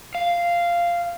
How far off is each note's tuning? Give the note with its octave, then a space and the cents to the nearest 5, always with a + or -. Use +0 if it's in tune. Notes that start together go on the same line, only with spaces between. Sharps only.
F5 -10